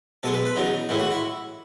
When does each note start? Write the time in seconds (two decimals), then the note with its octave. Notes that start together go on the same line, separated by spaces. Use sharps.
0.23 B1 B2 G#3 A4
0.34 B4
0.45 B4
0.56 E2 C#3 F#3 D#4
0.89 A1 A2 E3 G#3 E4
1.00 F#4
1.10 E4